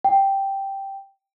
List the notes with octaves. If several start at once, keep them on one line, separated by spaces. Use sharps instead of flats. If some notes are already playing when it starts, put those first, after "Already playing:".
G5